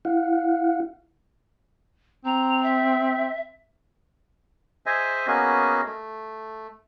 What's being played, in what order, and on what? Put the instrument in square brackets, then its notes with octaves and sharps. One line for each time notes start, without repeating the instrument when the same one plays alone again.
[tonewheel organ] E4 F5 F#5
[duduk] C4 [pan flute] A#5
[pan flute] E5
[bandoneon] G#4 C5 D#5 E5 G#5
A#3 B3 C#4 F#4 G#4 D#5
A3